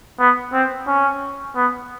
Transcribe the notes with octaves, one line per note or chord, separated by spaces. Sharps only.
B3
C4
C#4
B3